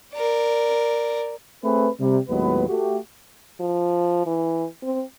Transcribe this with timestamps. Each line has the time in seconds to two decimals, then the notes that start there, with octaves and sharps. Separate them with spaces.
0.14 A#4 D5
1.63 A3 C4 G#4 B4
2.00 C3 G3
2.29 D#2 A2 F#3 G#3 B3 B4
2.69 A3 F#4 G4
3.60 F3
4.26 E3
4.83 C4